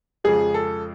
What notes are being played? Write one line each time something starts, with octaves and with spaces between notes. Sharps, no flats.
F2 C#3 F3 G#3 G#4
A4